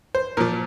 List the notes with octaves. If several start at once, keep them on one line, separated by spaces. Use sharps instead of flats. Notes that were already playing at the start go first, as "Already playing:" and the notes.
C5
A#2 F3 A#4